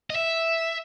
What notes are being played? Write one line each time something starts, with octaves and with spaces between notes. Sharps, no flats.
D#5
E5